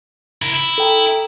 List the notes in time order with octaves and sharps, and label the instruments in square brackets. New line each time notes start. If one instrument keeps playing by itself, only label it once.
[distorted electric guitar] E4 A#4
E4
[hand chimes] A4 G5 A#5